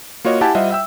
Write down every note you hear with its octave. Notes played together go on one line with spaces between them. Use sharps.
A#3 F4 F#4 C#5 D#5
E4 G4 E5 F#5 G#5 A5
G3 F4 C5 D#5 E5 F#5
E5 G5 E6